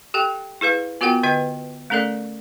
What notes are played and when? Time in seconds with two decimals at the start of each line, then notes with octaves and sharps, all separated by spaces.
0.14 G4 A4 G5
0.61 E4 G#4 B4 F5
1.01 B3 F4 F#4 A#4 F#5 G5
1.23 D3 B4 D#5 G5
1.90 A3 C#4 A4 A#4 D5